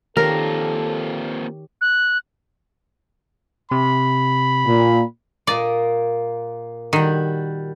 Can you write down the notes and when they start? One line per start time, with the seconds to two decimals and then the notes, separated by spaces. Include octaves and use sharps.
0.17 D#3 A#3 C4 F4 G4 A4 A#4 C#5
1.81 F#6
3.71 C3 B5
4.66 A#2
5.47 A#2 A#3 D5 D#5
6.93 D#3 G3 F#4